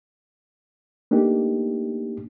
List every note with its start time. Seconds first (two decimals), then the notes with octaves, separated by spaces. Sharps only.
1.11 A3 A#3 D4 D#4 G4